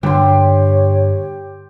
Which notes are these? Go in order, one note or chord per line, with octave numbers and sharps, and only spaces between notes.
G2 D3 G3 G4 C#5 C6